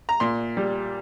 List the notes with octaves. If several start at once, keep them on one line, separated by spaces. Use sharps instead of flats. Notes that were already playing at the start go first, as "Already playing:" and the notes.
A#5
A#2 C6
G3